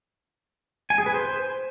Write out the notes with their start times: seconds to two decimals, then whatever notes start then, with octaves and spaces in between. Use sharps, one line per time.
0.90 G#5
0.98 G#4
1.06 B4
1.14 C5